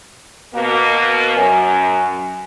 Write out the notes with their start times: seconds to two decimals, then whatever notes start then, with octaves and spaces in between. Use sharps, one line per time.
0.54 B2 A#3
1.37 F#2 G#5